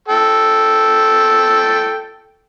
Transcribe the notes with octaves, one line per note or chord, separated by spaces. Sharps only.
A4 G5